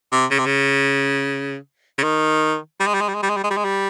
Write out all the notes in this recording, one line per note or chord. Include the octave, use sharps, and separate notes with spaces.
C3
C#3
C3
C#3
C#3
D#3
G3
G#3
G3
G#3
G3
G#3
G3
G#3
G3
G#3
G3
G#3
G3